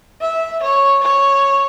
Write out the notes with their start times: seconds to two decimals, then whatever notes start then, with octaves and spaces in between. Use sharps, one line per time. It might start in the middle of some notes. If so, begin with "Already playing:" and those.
0.21 E5
0.63 C#5
1.03 C#5